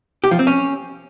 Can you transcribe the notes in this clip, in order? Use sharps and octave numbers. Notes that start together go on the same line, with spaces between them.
G4
F3
C4
C#4